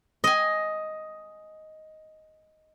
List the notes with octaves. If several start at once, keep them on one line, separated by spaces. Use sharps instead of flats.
D#5 G#5